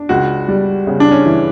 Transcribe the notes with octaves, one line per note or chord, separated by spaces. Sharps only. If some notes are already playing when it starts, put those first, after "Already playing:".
Already playing: D4
C#2 F#4
G3
C#3
D4
C#4
E3